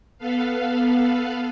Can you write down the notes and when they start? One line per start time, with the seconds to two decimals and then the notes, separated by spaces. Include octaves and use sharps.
0.18 B3 A4 B4 F5